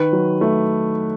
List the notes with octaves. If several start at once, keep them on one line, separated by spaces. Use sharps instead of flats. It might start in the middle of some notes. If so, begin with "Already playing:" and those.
Already playing: D#3 B4
F#3
A3